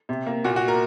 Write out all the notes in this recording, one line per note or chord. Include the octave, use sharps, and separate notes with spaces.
C3
A#3
A#2 F#4
F#4
A#4